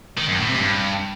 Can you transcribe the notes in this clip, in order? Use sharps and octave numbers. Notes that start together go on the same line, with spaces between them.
D#3
F#2
A2
C3
G2